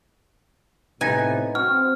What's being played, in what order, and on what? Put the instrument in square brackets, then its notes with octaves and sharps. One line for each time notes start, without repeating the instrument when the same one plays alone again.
[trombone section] A2 C3 [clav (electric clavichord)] B3 D#4 [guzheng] G#5
[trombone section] C4 [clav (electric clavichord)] F#4 [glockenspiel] F6